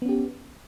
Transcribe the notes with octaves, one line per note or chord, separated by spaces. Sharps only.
B3 C#4 G4